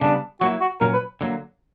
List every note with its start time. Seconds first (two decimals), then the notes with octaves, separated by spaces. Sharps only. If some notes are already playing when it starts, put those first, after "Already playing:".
0.01 C#3 G3 B3 D4
0.41 F#3 A#3 E4 F#4
0.61 F#4
0.81 A#2 F#3 C#4 A#4
0.94 B4
1.21 D3 F#3 A#3